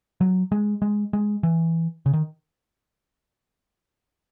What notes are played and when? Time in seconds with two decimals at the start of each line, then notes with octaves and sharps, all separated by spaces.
0.21 F#3
0.52 G#3
0.82 G#3
1.13 G#3
1.43 E3
2.06 C#3
2.13 D#3